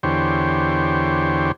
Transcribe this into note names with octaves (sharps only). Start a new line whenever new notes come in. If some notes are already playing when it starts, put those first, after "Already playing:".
E2 D3 G4 C5 C#5